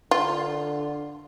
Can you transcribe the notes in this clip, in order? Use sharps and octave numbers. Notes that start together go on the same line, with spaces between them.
D3 F4